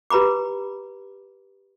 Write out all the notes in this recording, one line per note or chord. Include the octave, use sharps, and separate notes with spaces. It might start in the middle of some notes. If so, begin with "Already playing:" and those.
G4 B4 A#5 B5 D6